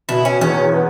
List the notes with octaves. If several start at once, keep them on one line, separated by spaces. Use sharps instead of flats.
B2 E4
C#4
E2 C#4
B3